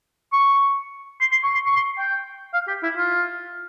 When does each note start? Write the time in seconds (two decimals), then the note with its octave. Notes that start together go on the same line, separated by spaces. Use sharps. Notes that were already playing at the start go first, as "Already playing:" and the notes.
0.33 C#6
1.21 C6
1.32 C6
1.43 C#6
1.54 C6
1.66 C#6
1.76 C6
1.98 G5
2.53 F5
2.68 G4
2.83 E4
2.97 F4